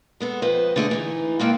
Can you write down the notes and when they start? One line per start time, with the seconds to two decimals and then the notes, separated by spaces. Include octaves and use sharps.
0.20 G#3 B3 A4
0.42 F2 B4 C5 D#5
0.76 D3 A3 G#4
0.91 E3 D#4
1.40 G#3 A#3 A4 F5 G5